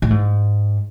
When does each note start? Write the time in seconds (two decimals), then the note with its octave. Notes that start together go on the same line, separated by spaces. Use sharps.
0.02 A2
0.10 G#2